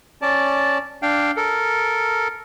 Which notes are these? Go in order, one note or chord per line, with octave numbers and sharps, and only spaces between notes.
C#4 D5 A5
D4 F5 G5
A4 A#4